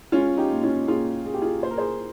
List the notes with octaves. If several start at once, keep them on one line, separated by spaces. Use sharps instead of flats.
G#3 C#4 F4
D#4 G4
A#2
C#4 F4
A#2 F4 G#4
A#2 G#4
G4
F4 G#4
A#2 C5
A#4
G#4 C5